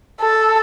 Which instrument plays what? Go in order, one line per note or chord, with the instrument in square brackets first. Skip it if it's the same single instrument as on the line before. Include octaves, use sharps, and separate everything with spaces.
[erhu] A4